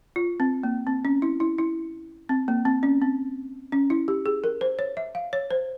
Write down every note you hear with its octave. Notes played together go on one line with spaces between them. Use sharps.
F4
C4
A#3
C4
C#4
E4
E4
E4
C4
A#3
C4
C#4
C4
C#4
E4
G4
G#4
A#4
C5
C#5
E5
F5
C#5
C5